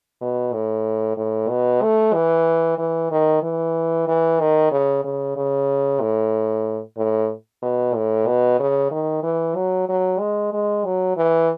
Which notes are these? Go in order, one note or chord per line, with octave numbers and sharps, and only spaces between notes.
B2
A2
A2
B2
A3
E3
E3
D#3
E3
E3
D#3
C#3
C#3
C#3
A2
A2
B2
A2
B2
C#3
D#3
E3
F#3
F#3
G#3
G#3
F#3
E3